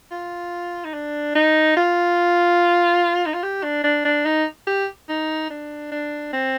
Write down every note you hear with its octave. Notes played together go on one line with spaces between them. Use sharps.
F4
D#4
D4
D#4
F4
D#4
F4
G4
D4
D4
D4
D#4
G4
D#4
D4
D4
C4